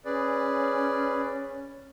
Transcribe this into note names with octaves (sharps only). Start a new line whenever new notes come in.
C#4 G#4 B4 D5